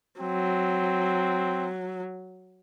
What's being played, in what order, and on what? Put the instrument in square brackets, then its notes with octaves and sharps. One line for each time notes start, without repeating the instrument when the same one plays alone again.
[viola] F#3 [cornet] C4